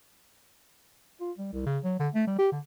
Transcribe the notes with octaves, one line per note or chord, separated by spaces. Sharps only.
F4
G3
C2
C#3
F#3
D3
A3
G3
G4
D3